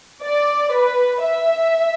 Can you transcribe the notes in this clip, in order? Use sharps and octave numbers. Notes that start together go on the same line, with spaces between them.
D5
B4
E5